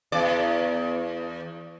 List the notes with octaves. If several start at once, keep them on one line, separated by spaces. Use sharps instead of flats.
E2 D5